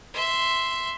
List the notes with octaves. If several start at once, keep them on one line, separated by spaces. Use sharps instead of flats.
E5 C6